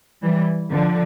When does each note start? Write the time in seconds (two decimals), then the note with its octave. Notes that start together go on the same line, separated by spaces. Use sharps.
0.22 E3 G3
0.70 D3 F3